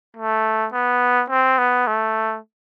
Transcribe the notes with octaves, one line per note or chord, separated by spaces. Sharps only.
A3
B3
C4
B3
A3